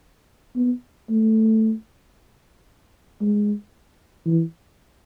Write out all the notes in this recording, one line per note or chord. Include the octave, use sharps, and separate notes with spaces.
B3
A3
G#3
E3